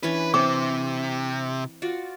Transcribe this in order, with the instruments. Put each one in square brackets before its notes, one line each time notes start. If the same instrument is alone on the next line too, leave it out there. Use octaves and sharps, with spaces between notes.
[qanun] E3 C#4 D4 [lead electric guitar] B4
[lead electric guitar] C3 [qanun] C4 [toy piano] D6
[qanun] F4 F#4 D5